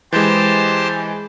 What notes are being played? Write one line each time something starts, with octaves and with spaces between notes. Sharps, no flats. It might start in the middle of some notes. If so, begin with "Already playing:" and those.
E3 G#3 G4 C5 A5